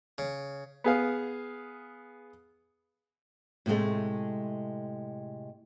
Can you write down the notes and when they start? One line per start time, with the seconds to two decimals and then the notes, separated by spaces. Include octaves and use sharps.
0.18 C#3
0.84 B3 G#4 F5
3.66 A2 C3 F3 G#3 A3